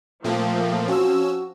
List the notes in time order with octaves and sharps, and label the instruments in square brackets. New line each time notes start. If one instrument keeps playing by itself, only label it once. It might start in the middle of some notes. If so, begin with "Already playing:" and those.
[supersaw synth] A#2 A3 A#3 [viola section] F3 C4
[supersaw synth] C#4 E6 [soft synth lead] F#4